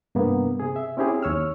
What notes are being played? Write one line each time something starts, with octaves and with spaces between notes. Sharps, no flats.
G2 C3 A#3 B3
C3 G#4
E5
C4 C#4 E4 G4 G#4
D#2 C#5 E6 F6